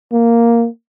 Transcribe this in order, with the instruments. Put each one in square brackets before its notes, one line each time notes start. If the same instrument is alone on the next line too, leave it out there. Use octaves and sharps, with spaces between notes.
[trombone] A#3